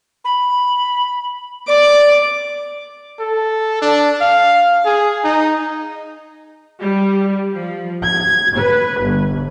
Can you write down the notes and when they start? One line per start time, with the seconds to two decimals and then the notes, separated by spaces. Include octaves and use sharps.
0.25 B5
1.68 D5 D6
3.19 A4
3.82 D4
4.21 F5
4.85 G#4
5.24 D#4
6.81 G3
7.55 F3
8.04 G#6
8.57 B4
9.02 G1